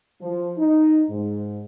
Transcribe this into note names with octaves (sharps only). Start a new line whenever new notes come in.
F3
D#4
G#2